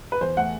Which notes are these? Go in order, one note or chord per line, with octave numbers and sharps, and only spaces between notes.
B4
E2 C5
A3 F#5